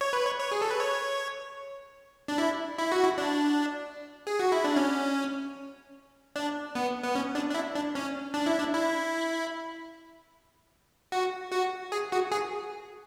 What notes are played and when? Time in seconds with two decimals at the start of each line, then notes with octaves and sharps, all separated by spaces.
0.01 C#5
0.13 B4
0.26 C#5
0.40 C#5
0.51 G#4
0.62 A4
0.71 B4
0.80 C#5
2.28 D4
2.38 E4
2.78 E4
2.92 F#4
3.04 E4
3.18 D4
4.27 G#4
4.40 F#4
4.52 E4
4.64 D4
4.76 C#4
6.36 D4
6.75 B3
7.03 B3
7.15 C#4
7.35 D4
7.50 D4
7.54 E4
7.75 D4
7.95 C#4
8.34 D4
8.46 E4
8.59 D4
8.74 E4
11.12 F#4
11.52 F#4
11.92 G#4
12.12 F#4
12.31 G#4